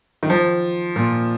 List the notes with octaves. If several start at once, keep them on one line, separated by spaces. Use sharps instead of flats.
D#3
F3
A#2